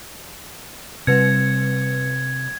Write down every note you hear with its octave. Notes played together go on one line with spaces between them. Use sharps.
C3 G3 B4 G#6 C#7